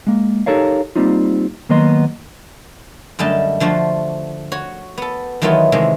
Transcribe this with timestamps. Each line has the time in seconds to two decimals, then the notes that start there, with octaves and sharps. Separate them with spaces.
0.07 G#3 A#3
0.46 D#4 G4 A4 A#4 C#5 F5
0.96 G3 A#3 C4 D#4 F4
1.69 D#3 F#3 A#3 B3 D#5 C6
3.19 F#2 D3 G3 A3 D#5 A5
3.60 D3 F3 A3 F#4 C5
4.52 F#4 C#5
4.98 B3 A4
5.42 D#3 E3 F#3 A3 B3 F4
5.72 C3 D#3 E3 G#3